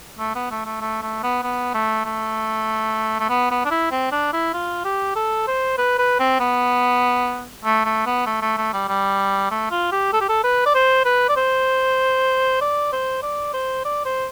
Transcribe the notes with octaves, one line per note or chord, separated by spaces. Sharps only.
A3
B3
A3
A3
A3
A3
B3
B3
A3
A3
A3
B3
B3
D4
E4
C4
D4
E4
F4
G4
A4
C5
B4
B4
C4
B3
A3
A3
B3
A3
A3
A3
G3
G3
A3
F4
G4
A4
G4
A4
B4
D5
C5
B4
D5
C5
D5
C5
D5
C5
D5
C5